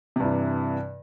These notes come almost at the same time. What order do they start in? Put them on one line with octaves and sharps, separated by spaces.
C3 G2 E3